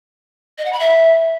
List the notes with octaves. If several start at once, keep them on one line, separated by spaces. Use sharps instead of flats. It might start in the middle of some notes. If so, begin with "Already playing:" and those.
D#5
F#5
B5
E5